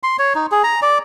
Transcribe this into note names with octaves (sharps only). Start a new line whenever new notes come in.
C6
C#5
D#4
G#4
A#5
D5